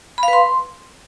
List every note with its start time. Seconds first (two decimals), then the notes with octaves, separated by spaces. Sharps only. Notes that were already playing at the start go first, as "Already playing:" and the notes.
0.18 B5
0.23 F5
0.28 B4
0.33 C6